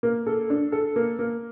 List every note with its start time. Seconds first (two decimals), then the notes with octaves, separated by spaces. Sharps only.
0.03 A#3
0.27 A4
0.50 D4
0.72 A4
0.96 A#3
1.19 A#3